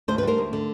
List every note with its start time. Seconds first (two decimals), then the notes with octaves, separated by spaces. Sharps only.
0.08 D2 C5
0.18 B4
0.23 G3 A#4 C5
0.38 D2
0.53 D3